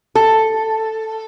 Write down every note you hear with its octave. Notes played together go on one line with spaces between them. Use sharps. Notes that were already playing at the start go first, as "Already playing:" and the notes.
A4